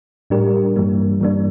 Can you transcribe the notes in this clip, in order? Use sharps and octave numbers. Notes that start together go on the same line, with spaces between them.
A2 G3 D4 G4 A#4
G2 E3 G3 A#3 D4
G2 E3 G3 A#3 D4